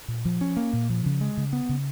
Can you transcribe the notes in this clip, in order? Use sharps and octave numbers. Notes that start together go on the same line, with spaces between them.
A#2
F3
C#4
A#3
A#2
F3
C#3
G#3
C#3
B3
C#3